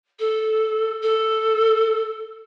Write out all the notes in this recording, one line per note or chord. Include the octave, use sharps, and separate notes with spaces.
A4
A4